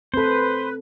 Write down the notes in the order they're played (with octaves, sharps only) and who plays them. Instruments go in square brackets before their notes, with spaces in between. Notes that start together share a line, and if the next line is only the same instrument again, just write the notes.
[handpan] C4 A4 [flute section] B4 [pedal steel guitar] C5